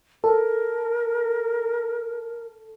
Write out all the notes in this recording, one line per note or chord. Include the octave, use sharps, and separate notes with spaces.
A4 A#4